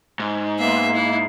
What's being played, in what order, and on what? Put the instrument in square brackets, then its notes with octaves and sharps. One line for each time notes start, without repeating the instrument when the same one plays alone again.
[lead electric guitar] G#2
[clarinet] A#3 [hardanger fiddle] B3 E5 [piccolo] C7
[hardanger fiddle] E4